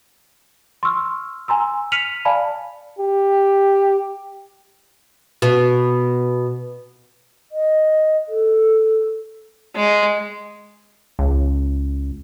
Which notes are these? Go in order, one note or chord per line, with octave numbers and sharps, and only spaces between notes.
C6 C#6 E6 F6
G#5 A#5 C6 E6
F6 B6 C#7 D#7 F7 F#7
D5 F5 G#5 A5 B5
G4
B2
D#5
A4
G#3
C#2